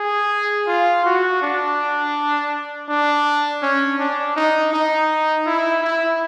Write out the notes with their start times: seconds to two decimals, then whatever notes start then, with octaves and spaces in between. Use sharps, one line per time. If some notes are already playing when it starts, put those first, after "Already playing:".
Already playing: G#4
0.67 F4
1.05 F#4
1.42 D4
2.89 D4
3.62 C#4
3.99 D4
4.36 D#4
4.73 D#4
5.46 E4
5.84 E4